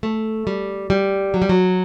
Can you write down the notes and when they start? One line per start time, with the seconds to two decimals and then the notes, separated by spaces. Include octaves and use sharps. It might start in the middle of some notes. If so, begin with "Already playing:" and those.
0.03 A3
0.47 G3
0.90 G3
1.34 F#3
1.42 G3
1.49 F#3